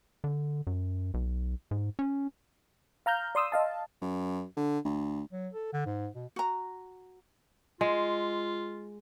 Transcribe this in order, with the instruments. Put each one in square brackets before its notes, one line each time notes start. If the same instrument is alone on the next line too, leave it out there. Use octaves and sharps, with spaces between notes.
[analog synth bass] D3
F#2
B1
G#2
C#4
[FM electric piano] F5 A#5 F6 G6
D5 C6 D#6 E6
D#5 F5 A5
[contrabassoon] F#2
D3
D2
[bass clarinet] F#3
A4
D3
G#2
B2
[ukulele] F#4 A#5
[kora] G#3 [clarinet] F4